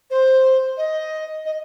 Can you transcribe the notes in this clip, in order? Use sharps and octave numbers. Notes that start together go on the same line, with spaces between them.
C5
D#5
D#5